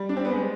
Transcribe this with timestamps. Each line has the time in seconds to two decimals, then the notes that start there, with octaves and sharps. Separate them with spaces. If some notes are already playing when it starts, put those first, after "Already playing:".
Already playing: G3
0.09 D4
0.17 C4
0.25 B3
0.32 G#3